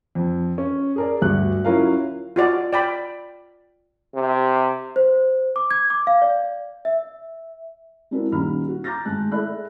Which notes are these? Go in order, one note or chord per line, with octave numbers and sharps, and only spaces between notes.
F2
C#4
G#4 A#4 D5
D2 G2 F#4 F#6
F#3 C#4 E4 F4 A#4 F5
F4 F#4 D5 D#5
D5 G5 B5
C3
C5
D6
G#6
D6
F5
D5
E5
G#3 C4 D4 E4 F#4 A#4
D#1 D#3 C#4 A#5 B5 F6
F#4
A#5 D6 F6 G6 A6 A#6
G#1 D2 G#3 A5 F#6
G#4 A4 D5 E5 B5 F#6